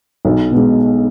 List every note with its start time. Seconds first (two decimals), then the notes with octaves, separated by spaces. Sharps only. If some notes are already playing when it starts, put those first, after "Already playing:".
0.25 B1
0.51 B2 G#3